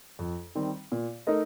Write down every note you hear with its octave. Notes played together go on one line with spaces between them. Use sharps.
F2
D#3 G3 C4
A#2
A3 D#4 A#4 D#5